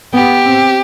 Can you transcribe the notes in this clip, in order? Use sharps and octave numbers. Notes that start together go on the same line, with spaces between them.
B3 G4
C4